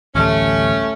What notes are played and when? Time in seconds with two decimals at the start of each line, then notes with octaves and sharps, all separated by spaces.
0.15 A1 D2 G3 A3 C#4